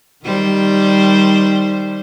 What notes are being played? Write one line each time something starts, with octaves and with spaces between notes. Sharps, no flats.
D#3 G3 C5